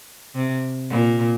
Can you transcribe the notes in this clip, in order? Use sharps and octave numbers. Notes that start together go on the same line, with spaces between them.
C3
A#2